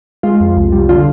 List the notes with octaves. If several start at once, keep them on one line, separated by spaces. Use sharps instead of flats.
G#3 F4
F2
C2
G3
D3 F4